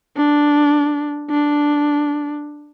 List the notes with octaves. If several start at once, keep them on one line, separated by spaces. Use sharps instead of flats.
D4
D4